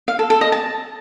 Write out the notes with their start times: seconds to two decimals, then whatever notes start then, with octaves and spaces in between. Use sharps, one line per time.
0.08 F5
0.19 A4
0.30 A4
0.41 D#5
0.52 A5